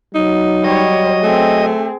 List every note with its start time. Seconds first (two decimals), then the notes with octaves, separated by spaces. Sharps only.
0.15 F#3 D#4
0.64 G3 C#5 D#5
1.23 A3 C4 G#4